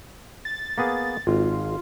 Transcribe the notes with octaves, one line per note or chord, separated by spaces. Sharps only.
A6
A#3 B3 G#4
G#1 F4